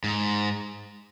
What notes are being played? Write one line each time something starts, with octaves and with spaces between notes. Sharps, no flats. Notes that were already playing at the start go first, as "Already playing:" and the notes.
G#2